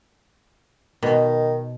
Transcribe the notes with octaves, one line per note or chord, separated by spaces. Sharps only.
B2 D#3